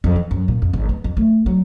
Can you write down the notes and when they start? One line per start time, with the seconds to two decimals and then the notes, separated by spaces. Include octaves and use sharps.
0.04 F2
0.16 E3
0.31 F#2
0.48 A#2
0.62 F2
0.73 G#1
0.89 B3
1.04 F2
1.17 A3
1.46 F#3